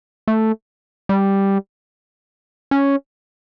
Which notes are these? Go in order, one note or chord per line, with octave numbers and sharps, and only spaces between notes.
A3
G3
C#4